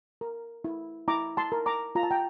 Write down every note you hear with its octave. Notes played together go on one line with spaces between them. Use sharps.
A#4
E4
E4 A#5 D6
A5 C6
A#4
A#5 D6
F4 A#5
A5
G5 A#5